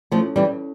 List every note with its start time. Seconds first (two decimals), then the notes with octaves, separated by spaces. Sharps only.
0.11 F3 A3 C#4 E4 A4 C#5
0.36 E3 G3